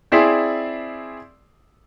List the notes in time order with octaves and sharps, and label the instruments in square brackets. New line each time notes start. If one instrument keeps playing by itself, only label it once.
[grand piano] C4 E4 G#4 D5 E5 C6